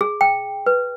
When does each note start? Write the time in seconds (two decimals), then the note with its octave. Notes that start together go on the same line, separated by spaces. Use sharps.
0.01 G#4
0.21 G5
0.66 B4